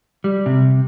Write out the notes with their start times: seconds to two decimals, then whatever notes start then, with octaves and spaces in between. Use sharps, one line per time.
0.24 G3
0.46 C3